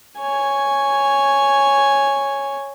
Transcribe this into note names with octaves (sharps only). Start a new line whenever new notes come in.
C#5 G#5